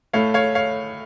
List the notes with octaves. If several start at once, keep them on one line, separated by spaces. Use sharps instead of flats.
A2 A3 C#5 F5
C#5 F5
C#5 F5